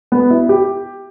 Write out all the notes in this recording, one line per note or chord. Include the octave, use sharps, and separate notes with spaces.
B3
E4
G4